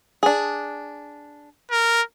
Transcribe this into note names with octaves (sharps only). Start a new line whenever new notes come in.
D4 G#4
A#4